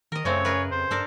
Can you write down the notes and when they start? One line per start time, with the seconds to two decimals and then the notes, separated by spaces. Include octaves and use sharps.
0.12 D#3 A#4 D#5
0.25 F#2 C#3 A3 C4 C#5
0.45 G#4 A#4 B4
0.72 F2 C5
0.91 G2 D4 A4 A#4